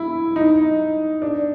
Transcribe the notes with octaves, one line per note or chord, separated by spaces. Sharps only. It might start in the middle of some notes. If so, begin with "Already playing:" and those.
Already playing: E4
D#4
D4